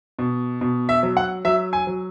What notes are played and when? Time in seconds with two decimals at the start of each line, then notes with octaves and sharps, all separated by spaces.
0.19 B2
0.61 B2
0.89 E5
1.03 F#3
1.17 F#5
1.45 F#3 E5
1.73 G#5
1.87 F#3